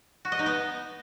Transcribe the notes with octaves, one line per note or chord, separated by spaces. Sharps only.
F#4
D#5
D#4
B3